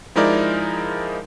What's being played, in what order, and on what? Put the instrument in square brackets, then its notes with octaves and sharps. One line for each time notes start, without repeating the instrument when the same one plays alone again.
[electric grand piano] F3 G#3 D#4 E4 A#4 D5